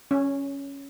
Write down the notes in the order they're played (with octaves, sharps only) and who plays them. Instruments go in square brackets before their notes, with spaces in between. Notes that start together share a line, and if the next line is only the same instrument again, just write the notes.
[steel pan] C#4